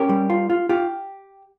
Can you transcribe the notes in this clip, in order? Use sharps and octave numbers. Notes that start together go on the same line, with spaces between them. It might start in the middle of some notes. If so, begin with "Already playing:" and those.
Already playing: C#4 G4 A#4
G3
F4
F4
F4 G4